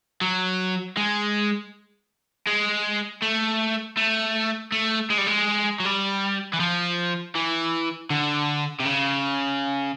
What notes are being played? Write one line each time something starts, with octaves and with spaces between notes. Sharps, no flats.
F#3
G#3
G#3
A3
A3
A3
G#3
G3
G#3
F#3
G3
E3
F3
E3
D3
C3
C#3